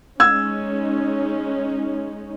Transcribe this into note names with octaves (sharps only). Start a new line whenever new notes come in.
G#3 C#4 D#4 E6 G#6